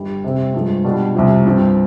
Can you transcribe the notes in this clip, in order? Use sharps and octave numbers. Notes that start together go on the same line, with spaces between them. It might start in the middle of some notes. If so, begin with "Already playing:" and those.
Already playing: G1 G2 G3
C3 G3 C4
G2 F3 G#3
B2 G3 D4 F4
C2 C3 F3
G2 F3 C4